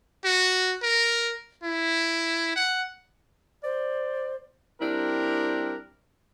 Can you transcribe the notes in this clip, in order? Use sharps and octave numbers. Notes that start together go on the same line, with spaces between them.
F#4
A#4
E4
F#5
C5 D5
G3 C4 D4 E4 A#4